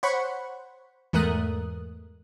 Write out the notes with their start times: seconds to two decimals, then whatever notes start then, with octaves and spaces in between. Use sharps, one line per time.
0.03 C5 C#5 F#5 B5 C#6
1.13 E2 G#2 A3 A#4 D#6 F#6